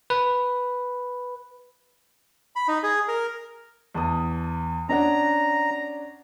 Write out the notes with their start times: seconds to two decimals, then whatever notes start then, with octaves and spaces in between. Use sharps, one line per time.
0.10 B4
2.56 B5
2.68 D#4
2.83 G#4
3.08 A#4
3.94 E2 A5 D#6
4.89 C#4 D4 F#5 A#5